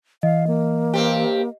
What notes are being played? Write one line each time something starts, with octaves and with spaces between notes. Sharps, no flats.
E3 D#5 F5
A#3
G2 C4 G4